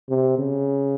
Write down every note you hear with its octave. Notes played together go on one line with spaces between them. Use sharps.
C3
C#3